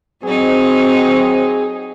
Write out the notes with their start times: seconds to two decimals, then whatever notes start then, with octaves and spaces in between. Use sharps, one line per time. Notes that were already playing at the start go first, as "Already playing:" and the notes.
0.23 F#3 C4 D#4 G#4